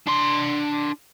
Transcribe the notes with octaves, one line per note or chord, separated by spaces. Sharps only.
D4 C6